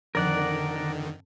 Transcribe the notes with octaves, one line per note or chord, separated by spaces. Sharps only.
F2 D3 D#3 A#4 D5 F#5